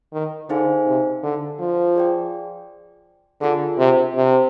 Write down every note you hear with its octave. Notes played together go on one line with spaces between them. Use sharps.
D#3
D3 D#4 G#4 C5 F5 G#5
C3
D3
F3
G#4 D5 G5
D3 D4 F4 G#4
C3
C3